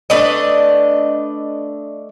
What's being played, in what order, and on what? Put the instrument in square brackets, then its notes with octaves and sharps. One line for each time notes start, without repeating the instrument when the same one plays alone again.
[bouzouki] A3 D4 B4 D#5